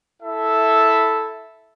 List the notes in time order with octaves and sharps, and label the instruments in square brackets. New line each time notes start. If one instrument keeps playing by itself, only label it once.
[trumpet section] E4 A4 E5